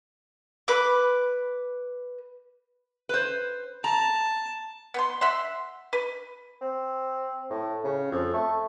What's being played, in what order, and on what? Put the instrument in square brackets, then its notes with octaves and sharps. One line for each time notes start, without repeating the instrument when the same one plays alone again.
[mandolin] B4 D6
[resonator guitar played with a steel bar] B4 C5
[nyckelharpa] A5 [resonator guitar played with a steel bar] A#5
[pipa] B3 F#5 C6
E5 F#5 C6
B4
[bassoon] C4
A2
C#3
F2
A3